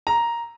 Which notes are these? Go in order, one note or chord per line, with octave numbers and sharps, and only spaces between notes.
A#5